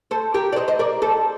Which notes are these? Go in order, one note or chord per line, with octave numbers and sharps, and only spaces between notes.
A4 C5
G4 A#4
D5
C5 D#5
C5 D#5
A#4 D5
A4 C5